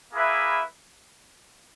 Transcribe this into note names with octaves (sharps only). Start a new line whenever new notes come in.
A#3 E4 G#4 B4 E5